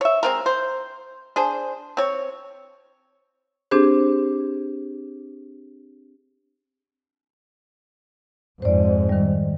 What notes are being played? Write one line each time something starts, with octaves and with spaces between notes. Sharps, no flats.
C#5 E5
G#3 C4 A#4
C5
D4 G#4 C5
C4 C#5
C4 D4 G4 G#4 C5
F2 G#2 C5 D5
D#3 G3